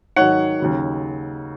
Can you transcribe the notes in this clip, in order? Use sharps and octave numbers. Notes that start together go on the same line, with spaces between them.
G#2 D#3 F#3 C#5 F#5
D#2 C#3 F#3